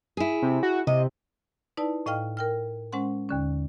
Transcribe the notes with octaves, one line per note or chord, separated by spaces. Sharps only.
E4 G#4
C3
F#4
C3 D#5
D#4 E4 B4 D5 A5
A2 D#5 F5 G5 F6
A#4 G5 F6
G#3 C#4 C5 F#5 C6
D#2 D3 C#4